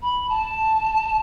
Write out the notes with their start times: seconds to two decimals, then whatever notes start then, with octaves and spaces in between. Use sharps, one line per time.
0.02 B5
0.29 A5